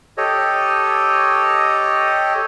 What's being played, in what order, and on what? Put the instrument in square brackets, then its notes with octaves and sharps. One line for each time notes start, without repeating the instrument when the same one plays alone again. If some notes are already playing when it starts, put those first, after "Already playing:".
[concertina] G4 A4 C#5 D#5